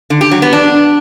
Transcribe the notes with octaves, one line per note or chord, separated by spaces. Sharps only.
D3
G4
F#3
B3
D4